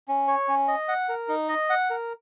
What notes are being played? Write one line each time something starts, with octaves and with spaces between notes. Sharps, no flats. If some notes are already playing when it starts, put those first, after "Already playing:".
C#4
C#5
C#4
D#5
F#5
A#4
D#4
D#5
F#5
A#4